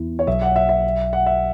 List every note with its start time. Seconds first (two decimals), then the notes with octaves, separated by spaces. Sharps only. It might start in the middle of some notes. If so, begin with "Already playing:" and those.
Already playing: E2 E3 B3 E4
0.19 C#5
0.27 B1 B2 F#3 E5
0.42 F#5
0.56 E5
0.69 E5
1.13 F#5
1.26 E5